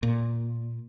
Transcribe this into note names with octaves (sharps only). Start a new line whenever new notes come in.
A#2